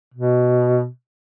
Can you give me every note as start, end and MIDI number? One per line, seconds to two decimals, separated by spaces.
0.14 0.87 47